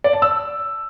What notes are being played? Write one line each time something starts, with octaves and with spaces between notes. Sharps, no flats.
D5
A5
E6